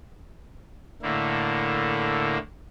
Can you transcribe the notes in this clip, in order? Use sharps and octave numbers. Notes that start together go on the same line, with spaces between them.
A2 D3 A#3 E4